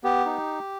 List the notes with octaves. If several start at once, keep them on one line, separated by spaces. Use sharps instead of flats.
B3 G4
D#4